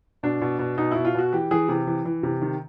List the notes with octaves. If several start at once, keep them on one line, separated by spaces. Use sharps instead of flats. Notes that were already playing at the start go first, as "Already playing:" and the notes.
B2 D4
B2
B2
B2 D#4
B2 E4
F4
B2 F#4
E3 G4
E3 G#4
C3
E3
E3
C3
D#3